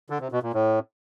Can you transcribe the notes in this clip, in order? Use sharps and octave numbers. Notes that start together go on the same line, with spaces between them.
D3
C3
B2
A#2
A2